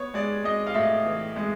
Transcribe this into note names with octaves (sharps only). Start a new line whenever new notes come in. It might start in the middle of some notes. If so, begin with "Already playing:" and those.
Already playing: B3 C#5
G#3 D5
G#3 D#5
F5
A2 E5
E3
G#3